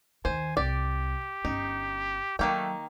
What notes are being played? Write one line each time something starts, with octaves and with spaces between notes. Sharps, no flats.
D#2 D#3 C5 G#5
C2 G4 D5
G1 C#4 D#4
D#3 F#3 A3 A#3 G5